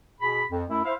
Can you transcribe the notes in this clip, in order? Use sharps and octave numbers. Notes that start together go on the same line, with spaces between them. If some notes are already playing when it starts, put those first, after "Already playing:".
B2 G#4 B5
F2
F#2 A3 E4
E4 C5 E5 F5